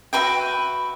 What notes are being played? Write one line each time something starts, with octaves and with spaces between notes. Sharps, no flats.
F#4 B4 E5 G5